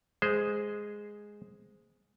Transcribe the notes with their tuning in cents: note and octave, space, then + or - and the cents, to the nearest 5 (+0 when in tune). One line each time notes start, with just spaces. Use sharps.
G#3 +0 G#4 +0 C5 -10